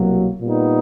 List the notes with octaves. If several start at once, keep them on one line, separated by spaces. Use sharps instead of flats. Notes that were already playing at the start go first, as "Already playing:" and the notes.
Already playing: C2 B2 F#3 A#3
A#2 G3 B3 D#4